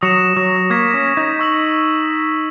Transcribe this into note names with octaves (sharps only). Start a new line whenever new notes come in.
F#3 D#6 A#6 C#7 E7
F#3
A#3 C#6 G#6 B6
C#4
D#4
C#6 E6 B6 F#7